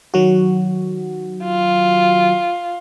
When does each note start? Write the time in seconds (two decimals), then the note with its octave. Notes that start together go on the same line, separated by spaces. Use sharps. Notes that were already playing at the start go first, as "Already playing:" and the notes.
0.14 D#3 F#3 F#4
1.44 F4